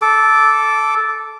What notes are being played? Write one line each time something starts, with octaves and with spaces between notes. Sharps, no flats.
A4 D6